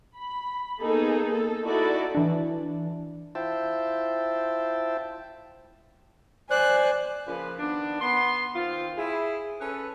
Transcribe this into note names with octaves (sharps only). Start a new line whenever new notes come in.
B5
A#3 B3 D#4 G#4 A4
A4
D#4 E4 F#4 A4 D5
E3 D4
E4 F4 C5 E5 G5 A5
C5 D5 G#5 F#6
C#3 F3 A#3 F4 B4
D#3 B3 D4
B3 C6
D#3 C4 F4
E4 G#4
C#4 A4 B4